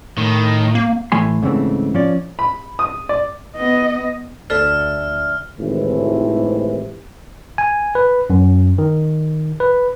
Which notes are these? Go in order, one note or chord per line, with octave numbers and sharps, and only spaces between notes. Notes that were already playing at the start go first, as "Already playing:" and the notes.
A2 D#3
A#3
A2 E3 A3 G#5 C6
G#2 C#3 E3 A3 C4
F3 C#4 D5
B5
D#6
D5
B3 D#5
D2 D4 A4 C5 E5 F6
G#1 A2 C3 E3
G#5
B4
F#2
D#3
B4